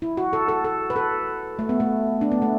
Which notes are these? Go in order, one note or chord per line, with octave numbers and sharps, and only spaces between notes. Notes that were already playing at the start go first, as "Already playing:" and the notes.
E4
F#4
A4
A4
A4
B4
A4
A3
B3
A3
D4
B3
A3